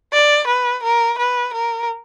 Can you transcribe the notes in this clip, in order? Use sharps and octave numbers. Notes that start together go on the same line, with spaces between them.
D5
B4
A#4
B4
A#4